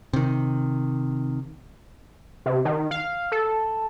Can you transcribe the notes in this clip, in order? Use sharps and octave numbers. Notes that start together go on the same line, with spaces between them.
C3 D#3
C3
D#3
F5
A4